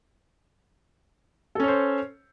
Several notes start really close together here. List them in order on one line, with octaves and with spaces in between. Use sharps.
A4 C#4 C#5 C5